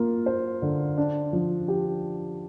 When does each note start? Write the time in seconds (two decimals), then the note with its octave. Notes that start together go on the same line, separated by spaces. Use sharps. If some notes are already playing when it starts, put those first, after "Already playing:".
Already playing: A#3 F4
0.26 C5
0.62 D3
0.98 D4
1.33 F3
1.68 G4